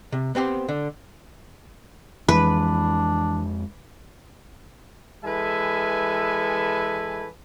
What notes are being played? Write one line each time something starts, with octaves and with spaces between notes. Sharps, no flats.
C3
B3 C4 G4 C5
D3
F2 E3 G#3 D4 B4
E3 G#3 A4 B4 E5 G#5